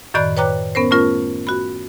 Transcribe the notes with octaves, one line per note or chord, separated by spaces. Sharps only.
F#2 A2 D#3 D5 B5 F#6
B4 C#5 G5 A#5 D6 F#6
B3 C#4 A#4 C5
A3 C#4 F4 A#4
F#4 B5